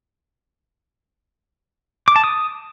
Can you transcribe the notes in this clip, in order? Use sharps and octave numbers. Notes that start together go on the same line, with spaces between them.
D6
A5
D#6